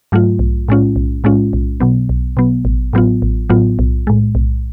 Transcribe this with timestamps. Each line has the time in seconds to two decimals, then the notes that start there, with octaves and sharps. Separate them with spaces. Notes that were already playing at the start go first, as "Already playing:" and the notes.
0.12 G#2 F#3 A3 F4
0.39 B1
0.68 A2 G#3 C#4 F4
0.96 B1
1.24 A2 G#3 C#4 F4
1.53 B1
1.80 B2 F#3 B3
2.09 B1
2.37 B2 F#3 B3
2.65 A1
2.93 A2 F#3 B3 F4
3.22 A1
3.50 A2 F#3 B3 F4
3.79 B1
4.07 A2 G#3
4.35 B1